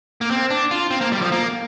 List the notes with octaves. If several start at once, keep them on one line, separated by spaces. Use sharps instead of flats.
A#3
C4
D4
F4
C4
A#3
G3
F3
A#3